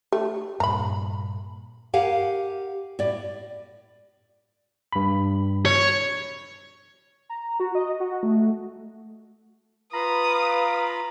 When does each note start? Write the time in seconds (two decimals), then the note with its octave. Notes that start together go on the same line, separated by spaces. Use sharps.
0.12 A3 G4
0.60 G2 A#2 A#5 B5
1.93 G4 A#4 F5 F#5 G#5
2.99 A2 D5
4.92 G2 B5
5.66 C#5
7.30 A#5
7.60 F#4
7.75 D#5
8.00 F#4
8.23 A3
9.93 F4 B4 F5 A#5 B5 D#6